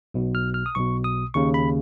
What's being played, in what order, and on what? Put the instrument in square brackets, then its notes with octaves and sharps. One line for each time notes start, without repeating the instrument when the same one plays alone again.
[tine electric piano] B1 B2
F6
F6
D#6
B1 B2 C#6
D#6
D#2 C#3 C#6
B5